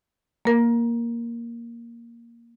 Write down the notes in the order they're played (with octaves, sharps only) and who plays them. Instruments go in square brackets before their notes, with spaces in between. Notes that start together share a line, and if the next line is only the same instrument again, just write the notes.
[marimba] A#3 A#4